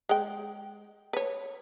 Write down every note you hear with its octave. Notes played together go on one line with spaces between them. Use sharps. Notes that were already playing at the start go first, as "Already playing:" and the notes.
G#3 G5
B4 C#5